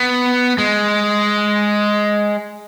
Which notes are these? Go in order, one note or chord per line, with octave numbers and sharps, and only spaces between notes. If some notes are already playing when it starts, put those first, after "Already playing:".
Already playing: B3
G#3